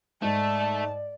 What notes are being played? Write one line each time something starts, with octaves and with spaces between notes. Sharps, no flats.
G#2 A3 D5 A5